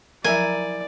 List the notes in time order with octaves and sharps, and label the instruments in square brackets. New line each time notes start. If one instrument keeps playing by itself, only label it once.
[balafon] F3 F#3 [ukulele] E4 A#4 [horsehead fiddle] D5 [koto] G#5